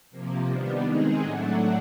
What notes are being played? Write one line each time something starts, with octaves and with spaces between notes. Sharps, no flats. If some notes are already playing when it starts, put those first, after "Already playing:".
C3 F3 A#3
D#3 G3 B3 D4
D#3 G#3 C4 D#4 G#4
A2 F#3 A3 D4 F#4